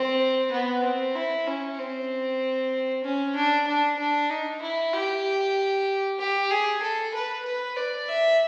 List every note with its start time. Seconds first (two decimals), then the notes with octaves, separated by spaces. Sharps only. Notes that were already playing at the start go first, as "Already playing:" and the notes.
Already playing: C4
0.52 B3
0.84 C4
1.15 E4
1.47 C#4
1.78 C4
3.04 C#4
3.36 D4
3.67 D4
3.99 D4
4.30 D#4
4.62 E4
4.93 G4
6.19 G4
6.51 G#4
6.82 A4
7.14 B4
7.45 B4
7.77 D5
8.08 E5